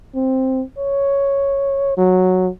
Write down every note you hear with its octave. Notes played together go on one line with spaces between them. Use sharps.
C4
C#5
F#3